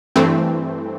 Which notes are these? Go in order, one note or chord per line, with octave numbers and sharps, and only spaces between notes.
G2 E3 A3 C4